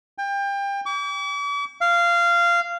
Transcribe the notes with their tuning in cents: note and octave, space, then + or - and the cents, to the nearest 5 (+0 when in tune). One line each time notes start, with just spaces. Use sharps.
G5 +30
D6 -45
F5 -15